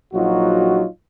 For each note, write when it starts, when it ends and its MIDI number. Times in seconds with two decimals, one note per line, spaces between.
0.13 0.85 34
0.13 0.85 54
0.13 0.85 63
0.13 0.85 65
0.13 0.85 66